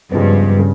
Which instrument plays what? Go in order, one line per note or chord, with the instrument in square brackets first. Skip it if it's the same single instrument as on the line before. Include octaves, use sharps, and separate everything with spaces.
[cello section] G2 [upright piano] C#3 F3 G#3 B3
[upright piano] C#3